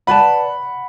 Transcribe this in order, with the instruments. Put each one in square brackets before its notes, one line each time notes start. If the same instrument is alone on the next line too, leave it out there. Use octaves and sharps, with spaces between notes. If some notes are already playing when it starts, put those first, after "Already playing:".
[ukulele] B4 D5 A5 [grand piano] F#5 B5